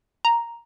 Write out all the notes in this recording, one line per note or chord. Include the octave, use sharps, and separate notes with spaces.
A#5